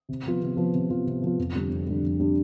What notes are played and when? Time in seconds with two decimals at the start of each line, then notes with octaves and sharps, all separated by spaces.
0.09 C3
0.26 F3 B3 F4
0.42 C3
0.57 F3 B3 F4
0.74 C3
0.90 F3 B3 F4
1.06 C3
1.22 F3 B3 F4
1.39 F2
1.55 D3 G3 D4
1.70 F2
1.87 D3 G3 D4
2.03 F2
2.19 D3 G3 D4